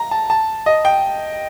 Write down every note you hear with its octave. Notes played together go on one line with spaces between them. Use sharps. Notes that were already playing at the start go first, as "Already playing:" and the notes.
Already playing: A#5
A5
A5
D#5
G5